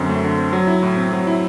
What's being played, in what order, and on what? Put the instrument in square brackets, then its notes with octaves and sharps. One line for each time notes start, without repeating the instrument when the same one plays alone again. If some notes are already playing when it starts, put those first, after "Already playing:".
Already playing: [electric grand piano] F#2 D3 C4
A3
D3
C4
F#3
E4
A2
C4
F#3
E4